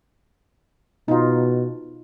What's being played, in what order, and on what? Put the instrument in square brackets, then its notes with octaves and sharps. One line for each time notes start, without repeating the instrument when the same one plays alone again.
[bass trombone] B2 [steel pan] D#4 F4